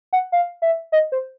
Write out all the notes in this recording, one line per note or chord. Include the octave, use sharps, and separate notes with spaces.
F#5
F5
E5
D#5
C5